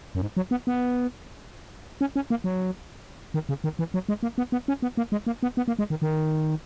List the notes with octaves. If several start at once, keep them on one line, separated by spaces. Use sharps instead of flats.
F#2
G#2
F#3
B3
B3
C#4
C#4
A#3
F#3
D#3
C#3
D#3
E3
F#3
G#3
A#3
B3
B3
C#4
B3
A#3
G#3
A#3
B3
B3
A#3
G#3
D#3
D#3